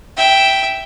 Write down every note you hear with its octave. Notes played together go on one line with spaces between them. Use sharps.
E5 G5